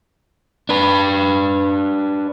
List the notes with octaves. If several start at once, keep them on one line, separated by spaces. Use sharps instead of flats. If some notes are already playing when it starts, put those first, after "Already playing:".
D4 B4